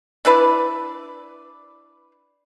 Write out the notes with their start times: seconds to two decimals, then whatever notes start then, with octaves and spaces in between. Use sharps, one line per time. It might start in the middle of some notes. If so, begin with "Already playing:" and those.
0.25 D4 E4 B4 D5